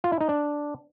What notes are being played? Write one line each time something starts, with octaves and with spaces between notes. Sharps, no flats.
F4
E4
D#4
D4